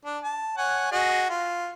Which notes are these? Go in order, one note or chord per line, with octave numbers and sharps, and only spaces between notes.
D4
A5
C#5 F#5 G#5
F#4 G#4 D#5
F4